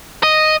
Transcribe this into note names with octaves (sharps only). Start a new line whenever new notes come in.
D#5